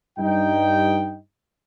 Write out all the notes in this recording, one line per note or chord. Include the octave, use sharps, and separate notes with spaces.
G2 D#4 G5